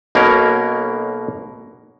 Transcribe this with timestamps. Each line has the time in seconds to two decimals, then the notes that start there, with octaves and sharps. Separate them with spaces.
0.15 B1 B2 A#3 B3 C#4 A#4